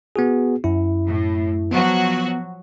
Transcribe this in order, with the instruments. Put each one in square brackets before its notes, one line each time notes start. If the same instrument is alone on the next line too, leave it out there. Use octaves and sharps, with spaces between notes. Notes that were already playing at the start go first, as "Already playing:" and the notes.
[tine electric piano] B3 F#4 G#4
F#2 E4
[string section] A2
[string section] F3 F#3 F#4 [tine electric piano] B3